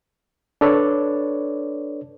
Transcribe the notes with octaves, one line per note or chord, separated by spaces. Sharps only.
D4 A4 B4 C#5 D5